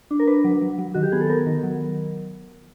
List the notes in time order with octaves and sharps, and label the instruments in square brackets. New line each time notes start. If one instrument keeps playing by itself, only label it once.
[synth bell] D4
A#4
D4 B4
F#3
F#3
F#3
D#3 F#4
G4
B3 G#4
A4
B3 A#4
D#3
F#3